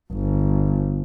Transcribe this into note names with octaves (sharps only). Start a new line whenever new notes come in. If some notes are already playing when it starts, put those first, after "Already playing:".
G1